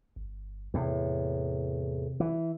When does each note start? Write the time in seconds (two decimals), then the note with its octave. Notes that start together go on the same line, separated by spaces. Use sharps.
0.16 G1
0.74 E2 A2 C3
2.20 E3